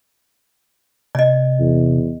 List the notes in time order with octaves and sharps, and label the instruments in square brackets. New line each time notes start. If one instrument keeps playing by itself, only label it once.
[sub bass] C3 [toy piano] D5 D#5
[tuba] E2